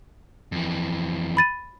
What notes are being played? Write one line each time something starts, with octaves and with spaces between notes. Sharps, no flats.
F2 E3
B5 A6 D#7